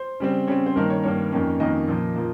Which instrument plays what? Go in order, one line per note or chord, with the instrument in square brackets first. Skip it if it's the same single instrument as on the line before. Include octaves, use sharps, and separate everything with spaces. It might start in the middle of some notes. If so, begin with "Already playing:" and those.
Already playing: [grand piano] C5
C#3 G3 C4
C#3 G3 C4 C#5
C5
G2 D#3 A#3 A#4
C#5
G2 D#3 A#3 C#5
F2 D#3 A#3 C#4
F2 D#3 A#3 C#4 D#5
A#2 F3 A#3
F3 A#3